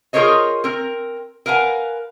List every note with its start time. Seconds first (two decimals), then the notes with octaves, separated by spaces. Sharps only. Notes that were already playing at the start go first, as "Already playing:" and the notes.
0.13 F4 G#4 A#4 C5 C#5 D#5
0.64 C4 A#4
1.46 A#4 B4 F5 F#5 G#5